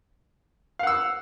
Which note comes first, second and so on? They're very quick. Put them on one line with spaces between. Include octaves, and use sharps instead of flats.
F5 F#5 E6